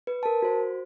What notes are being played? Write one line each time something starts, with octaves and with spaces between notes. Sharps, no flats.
B4
A#4 A5
F#4 C5